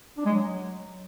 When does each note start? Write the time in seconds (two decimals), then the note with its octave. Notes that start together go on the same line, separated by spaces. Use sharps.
0.17 D4
0.25 G#3
0.33 F#3